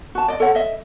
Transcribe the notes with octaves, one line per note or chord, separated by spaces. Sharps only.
F#4 A5
D5 D#5
A4 C#5 F#5
D#5 E5